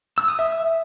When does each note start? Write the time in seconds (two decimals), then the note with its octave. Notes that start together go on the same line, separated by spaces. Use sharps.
0.18 E6
0.28 D#6
0.39 E5